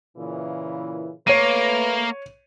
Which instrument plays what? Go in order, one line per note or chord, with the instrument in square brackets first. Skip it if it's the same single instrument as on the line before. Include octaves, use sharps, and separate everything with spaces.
[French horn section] A#2 C#3 E3
[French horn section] A3 B4 [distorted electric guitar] A#3 [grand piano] C#5 D#7